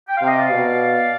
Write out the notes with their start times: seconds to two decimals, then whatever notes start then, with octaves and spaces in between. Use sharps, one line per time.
0.08 G5
0.17 C3 F5
0.27 D#5
0.36 D5 F5
0.51 B2